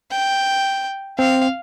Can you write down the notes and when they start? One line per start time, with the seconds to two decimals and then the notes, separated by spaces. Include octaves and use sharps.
0.11 G5
1.19 C4 F5